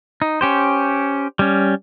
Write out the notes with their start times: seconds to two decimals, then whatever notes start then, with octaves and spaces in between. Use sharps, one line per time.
0.22 D#4
0.41 C#4 G4 C5
1.39 G3 C#4